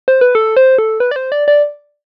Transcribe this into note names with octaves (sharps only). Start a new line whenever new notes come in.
C5
B4
A4
C5
A4
B4
D5
C5
D5
D5